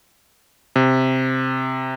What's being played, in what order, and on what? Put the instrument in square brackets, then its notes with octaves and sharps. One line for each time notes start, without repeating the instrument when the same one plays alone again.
[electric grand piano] C3